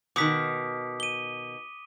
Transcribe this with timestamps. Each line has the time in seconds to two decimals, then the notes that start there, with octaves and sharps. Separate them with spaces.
0.16 B2 D#3 D6 D#6 B6
1.00 D#7 G7